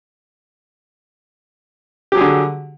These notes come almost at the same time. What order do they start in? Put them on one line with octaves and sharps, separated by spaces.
G4 F#3 G#4 D3